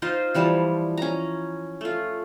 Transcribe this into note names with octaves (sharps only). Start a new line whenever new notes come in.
D#4 F4 C5 D#5
E3 F3 G3 A5
C#4 A#5
A3 F4